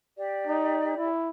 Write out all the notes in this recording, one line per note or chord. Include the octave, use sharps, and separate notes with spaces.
G4 D5
D#4
E4